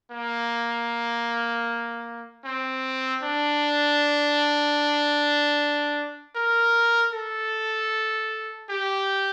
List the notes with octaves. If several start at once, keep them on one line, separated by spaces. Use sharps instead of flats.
A#3
C4
D4
A#4
A4
G4